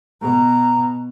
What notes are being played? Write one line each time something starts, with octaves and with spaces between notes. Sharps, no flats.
B2 A#5